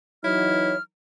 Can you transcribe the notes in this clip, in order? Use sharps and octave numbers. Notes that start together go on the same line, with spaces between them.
E3 F#3 D#4 E4 C#5 F6